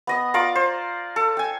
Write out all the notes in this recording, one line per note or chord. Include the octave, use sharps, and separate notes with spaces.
B3 D#5 D#6
F4 D5 A#5 D6
C5
A4
G5 G#5